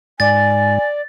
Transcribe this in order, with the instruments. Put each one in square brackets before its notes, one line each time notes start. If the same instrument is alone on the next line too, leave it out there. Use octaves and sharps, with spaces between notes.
[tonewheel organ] G#2 [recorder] D5 [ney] G#5 [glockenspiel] A6